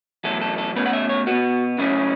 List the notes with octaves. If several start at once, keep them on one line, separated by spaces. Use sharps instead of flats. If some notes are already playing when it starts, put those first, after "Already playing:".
E2 B2 F#3 A3 A4
A4
A4
B2 A3 C#4 B4
F#5
E5
C#5
B2 B3 F#4
F#2 C#3 A3 C#4 E4